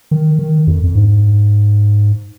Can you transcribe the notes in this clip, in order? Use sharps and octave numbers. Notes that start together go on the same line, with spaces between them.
D#3
D#3
F2
F2
G#2